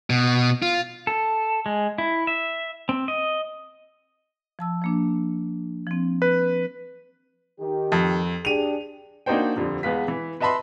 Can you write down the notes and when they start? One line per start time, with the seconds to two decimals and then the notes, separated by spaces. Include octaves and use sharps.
0.10 B2
0.62 F4
1.07 A4
1.66 G#3
1.98 E4
2.27 E5
2.89 C4
3.08 D#5
4.59 F3 A5 E6
4.82 F3 A#3 D4
5.87 F3 C4
6.22 B4
7.60 D#3 G4
7.92 F2
8.45 D4 G4 G#4 D#7 F7
9.26 A#3 D4 D#4 F#4 C5 G5
9.56 D#1 F2 D3
9.83 E2 G#3 B3 B4 F5 B6
10.08 E3
10.40 B4 D#5 E5 A5 B5 C6